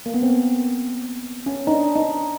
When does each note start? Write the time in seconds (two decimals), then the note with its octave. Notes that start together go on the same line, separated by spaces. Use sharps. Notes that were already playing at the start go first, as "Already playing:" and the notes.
0.06 A#3
0.14 B3
0.23 C4
1.46 C#4
1.67 D#4
1.71 D4
1.95 D#4